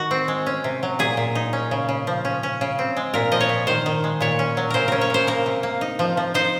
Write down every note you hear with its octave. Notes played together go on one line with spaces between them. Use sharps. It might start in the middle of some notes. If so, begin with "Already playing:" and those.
Already playing: D#3 F#4
C4
G#3
C#4
C3
F#3
A#2 G#4
A#2
D#4
C#4
C#3
C#3
F3
C#4
C#4
C#3
C4
G#3
A#2 A#4
F3 D#5
C#5
A#2
D#3 C5
D#3
G#3
A#2 C#5
C#4
F#3
C#3 A#4 C5
C#4 A#4
C#5
C#3 C5
A#3 A#4
C3
A#3
D#4
F3
F3
D#4 C5